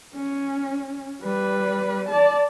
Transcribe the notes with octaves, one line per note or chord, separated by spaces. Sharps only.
C#4
G3 B4
D5 A5